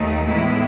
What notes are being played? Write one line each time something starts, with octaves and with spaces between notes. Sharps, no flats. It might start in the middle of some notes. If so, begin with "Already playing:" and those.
Already playing: D#2 D#3 A3 D#4
A2 E3 G#3 B3 E4